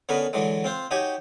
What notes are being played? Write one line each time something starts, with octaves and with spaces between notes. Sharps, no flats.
D3 B3 C#4 G#4 A#4 B4
D3 E3 F#3 G#3
C4 F4 C5
D#4 F#4 G4 C#5 G5 G#5